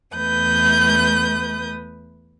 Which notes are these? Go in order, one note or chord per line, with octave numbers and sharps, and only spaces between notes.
E2 A3 B4 D#6 G6